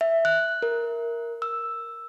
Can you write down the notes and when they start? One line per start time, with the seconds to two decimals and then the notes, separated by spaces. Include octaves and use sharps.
0.01 E5
0.25 F#6
0.62 A#4
1.42 E6